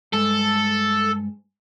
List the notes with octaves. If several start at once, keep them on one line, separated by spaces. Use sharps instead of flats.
G2 G#3 A4